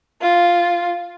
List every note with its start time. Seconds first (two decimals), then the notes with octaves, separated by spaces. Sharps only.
0.21 F4